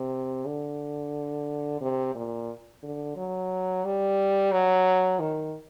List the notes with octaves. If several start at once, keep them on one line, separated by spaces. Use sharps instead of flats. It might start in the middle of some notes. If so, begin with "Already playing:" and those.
Already playing: C3
D3
C3
A#2
D3
F#3
G3
F#3
D#3